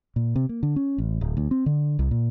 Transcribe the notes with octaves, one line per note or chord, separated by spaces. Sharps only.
A#2
C3
A#3
D3
C#4
A1
D1
D2
C4
D3
C2
A#2